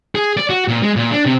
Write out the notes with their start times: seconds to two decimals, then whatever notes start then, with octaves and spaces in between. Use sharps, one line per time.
0.15 G#4
0.37 D5
0.50 F#4
0.68 A#2
0.83 G#3
0.96 A#2
1.12 D4
1.26 C3